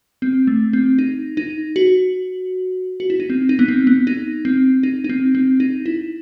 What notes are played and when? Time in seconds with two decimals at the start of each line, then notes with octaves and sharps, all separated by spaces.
0.22 C4
0.47 A3
0.73 C4
0.99 D#4
1.37 D#4
1.76 F#4
3.00 F#4
3.10 E4
3.20 D#4
3.30 C4
3.49 D#4
3.59 B3
3.68 C4
3.87 B3
4.07 D#4
4.45 C4
4.83 D#4
5.04 D#4
5.09 C4
5.35 C4
5.60 D#4
5.86 E4